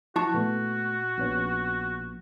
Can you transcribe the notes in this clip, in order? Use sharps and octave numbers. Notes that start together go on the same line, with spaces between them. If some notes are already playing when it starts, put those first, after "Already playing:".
F3 E4 F#4 A5 C#6
A#2 A3 B3
A#1 B3 C#4